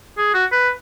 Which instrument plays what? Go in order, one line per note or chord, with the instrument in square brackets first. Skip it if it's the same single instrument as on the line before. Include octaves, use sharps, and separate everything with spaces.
[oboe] G#4
F#4
B4